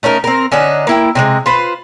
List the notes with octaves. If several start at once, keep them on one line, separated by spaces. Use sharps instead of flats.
A3 C#4 D#4 A#4
C4 A#4
D3 C#4 D#4 F#5
A#3 E4 G5
C3 F#3 G#3
F4 B4 C5